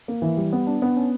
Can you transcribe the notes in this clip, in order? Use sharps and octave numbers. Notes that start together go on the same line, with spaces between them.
A#3
E3
G3
B3
D4
B3
C#4